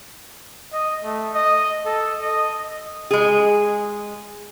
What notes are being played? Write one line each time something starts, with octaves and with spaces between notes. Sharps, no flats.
D#5
A3
D#5
A4
D#5
G#3 G#4